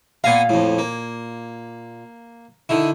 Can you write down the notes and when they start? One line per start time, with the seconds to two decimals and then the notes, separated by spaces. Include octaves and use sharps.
0.24 A#2 B3 F5 G#5 A#5
0.49 F2 A2
0.78 A#3
2.69 D3 D#3 E4